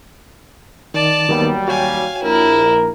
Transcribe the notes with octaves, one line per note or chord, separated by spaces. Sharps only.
D#3 D5 A5
D#2 D#3 F#3 G3 A#3 B3
F#4 C#5 F5 G5 G#5
A#1 E4 A#4